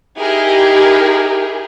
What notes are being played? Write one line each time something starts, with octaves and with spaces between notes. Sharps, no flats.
D#4 E4 G4 G#4 A#4